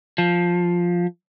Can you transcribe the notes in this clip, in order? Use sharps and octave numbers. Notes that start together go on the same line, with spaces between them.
F3